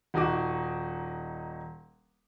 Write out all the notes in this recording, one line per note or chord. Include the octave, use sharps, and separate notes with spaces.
D#1 D#4 F#4 D6